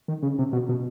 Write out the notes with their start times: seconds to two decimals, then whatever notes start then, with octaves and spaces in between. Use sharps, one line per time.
0.08 D#3
0.23 C#3
0.39 C3
0.53 B2
0.69 B2